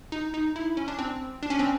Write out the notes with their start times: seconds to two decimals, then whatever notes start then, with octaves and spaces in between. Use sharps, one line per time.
0.12 D#4
0.34 D#4
0.56 E4
0.77 C#4
0.88 D4
0.99 C4
1.43 D4
1.50 C#4
1.59 C4